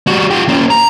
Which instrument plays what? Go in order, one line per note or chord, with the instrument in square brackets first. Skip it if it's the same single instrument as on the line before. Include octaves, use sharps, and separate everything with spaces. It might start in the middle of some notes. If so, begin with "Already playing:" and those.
[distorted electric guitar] G3 F#4
F4 G4
A#3 C#4
A#5